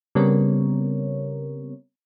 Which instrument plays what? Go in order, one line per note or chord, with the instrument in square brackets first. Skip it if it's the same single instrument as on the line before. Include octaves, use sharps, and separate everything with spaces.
[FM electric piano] C#3 G3 B3 C4 A#4 C#5